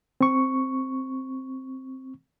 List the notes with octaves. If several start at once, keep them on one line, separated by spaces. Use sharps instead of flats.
C4 C#6